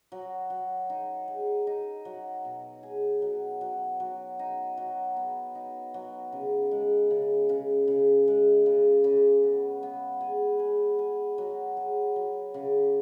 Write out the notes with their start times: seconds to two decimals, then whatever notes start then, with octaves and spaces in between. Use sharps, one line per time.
0.12 F#3
0.50 F#3
0.90 D#4
1.28 G#4
1.67 D#4
2.05 F#3
2.45 B2
2.83 G#4
3.22 F#3
3.61 F#3
4.00 F#3
4.39 D#4
4.77 F#3
5.17 B3
5.55 D#4
5.94 F#3
6.32 C#3
6.71 G#3
7.11 C#3
7.49 C#3
7.88 C#3
8.28 G#3
8.66 C#3
9.04 C#3
9.44 B3
9.83 B3
10.21 G#4
10.59 G#4
10.99 G#4
11.38 F#3
11.77 G#4
12.16 F#3
12.54 C#3